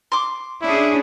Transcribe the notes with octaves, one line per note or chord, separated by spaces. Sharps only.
C6 D6
C#4 D4 E4 G#4